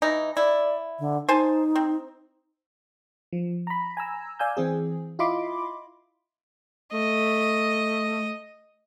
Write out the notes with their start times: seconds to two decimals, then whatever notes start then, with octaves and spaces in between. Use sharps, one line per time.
0.02 E3 D#4
0.37 E4 D5
0.99 D3
1.29 D#4 C5 G#5 A5
1.75 C4
3.33 F3
3.67 A#5 B5
3.97 G#5 A#5 E6
4.39 D5 F5 G#5 E6 G6
4.57 E3 C4 G#4
5.19 E4 F4 D#5 B5 C6 D6
6.93 A3 D#5